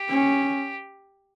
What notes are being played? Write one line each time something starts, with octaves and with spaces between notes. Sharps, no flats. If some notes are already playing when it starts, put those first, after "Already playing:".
Already playing: G4
C#4